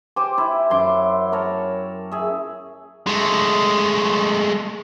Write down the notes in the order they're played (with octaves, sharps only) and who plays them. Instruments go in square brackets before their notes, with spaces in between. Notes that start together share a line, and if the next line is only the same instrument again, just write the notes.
[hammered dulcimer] G4 C5 G#5 D6
E4
F#2 C6 D6
A#4 C#5 A5
G#4 E5
[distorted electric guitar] G#3 A3